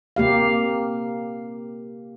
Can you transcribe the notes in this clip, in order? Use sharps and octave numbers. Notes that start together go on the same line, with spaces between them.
C3 A#3 G4 F5